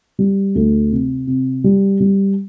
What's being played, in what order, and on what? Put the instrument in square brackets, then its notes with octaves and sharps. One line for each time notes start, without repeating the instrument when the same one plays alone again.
[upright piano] G3
D2
C3
C3
G3
G3